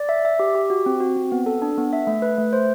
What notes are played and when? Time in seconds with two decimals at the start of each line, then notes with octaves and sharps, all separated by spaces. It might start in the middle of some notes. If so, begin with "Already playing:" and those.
Already playing: D5
0.09 E5
0.25 E5
0.39 G4
0.55 G4
0.70 F#4
0.86 C4
1.00 F#4
1.16 C4
1.32 B3
1.46 A4
1.62 D4
1.78 B3
1.93 E5
2.07 A3
2.22 B4
2.38 A3
2.53 C5